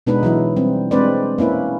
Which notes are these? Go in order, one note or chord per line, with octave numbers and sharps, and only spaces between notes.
B2 G#3 B3 D4 D#4 B4
E3 F#3 E4
G3 C4
G#3 C4 D4 B4 C5 D5
A#3 C#4 E4 B4